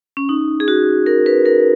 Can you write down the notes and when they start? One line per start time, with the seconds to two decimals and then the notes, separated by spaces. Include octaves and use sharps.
0.17 C#4
0.29 D#4
0.60 G#4
0.68 F#4
1.06 A#4
1.26 B4
1.46 A#4